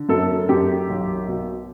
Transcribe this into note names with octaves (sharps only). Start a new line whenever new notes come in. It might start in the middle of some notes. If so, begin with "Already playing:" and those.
Already playing: D3
F#2 A4
F#2 G4
B1
B2